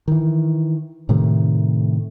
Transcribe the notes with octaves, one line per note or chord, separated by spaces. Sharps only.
D#3 E3
A2 C3 D#3 A3